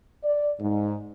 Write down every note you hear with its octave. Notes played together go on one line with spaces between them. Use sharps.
D5
G#2